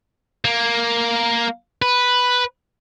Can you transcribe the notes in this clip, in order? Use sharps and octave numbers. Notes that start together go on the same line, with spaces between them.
A#3
B4